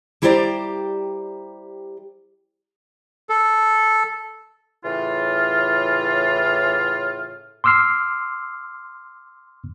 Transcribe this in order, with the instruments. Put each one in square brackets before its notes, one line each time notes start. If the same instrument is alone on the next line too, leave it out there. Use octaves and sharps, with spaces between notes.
[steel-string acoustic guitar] G3 E4 G4 C5 D5 A#5
[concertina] A4
[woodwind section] A2 C#3 E3 F4
[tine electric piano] C6 D6 E6 F6 C7